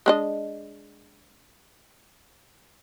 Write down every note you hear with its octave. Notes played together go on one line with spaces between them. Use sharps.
G#3 D4 D#5